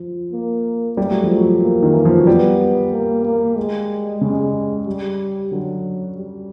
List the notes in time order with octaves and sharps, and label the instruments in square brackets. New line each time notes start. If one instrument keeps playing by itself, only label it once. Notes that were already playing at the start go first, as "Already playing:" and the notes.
Already playing: [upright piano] F3
[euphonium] A#3
[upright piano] G3 [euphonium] A3
[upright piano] F#3
F3
F#3
[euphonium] A#3
[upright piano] D#3
E3
F3
F#3
[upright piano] G3 [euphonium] B3
[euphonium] A#3
A#3
G#3
[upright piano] C#3 [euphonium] G#3
[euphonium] G3
[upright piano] D3 [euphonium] F#3
[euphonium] G3